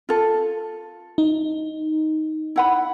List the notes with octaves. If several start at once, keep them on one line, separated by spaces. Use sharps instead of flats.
F4 A4
D#4
E4 F#5 B5